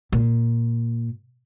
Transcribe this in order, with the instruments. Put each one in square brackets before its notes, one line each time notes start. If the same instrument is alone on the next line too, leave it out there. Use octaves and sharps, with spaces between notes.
[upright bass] A#2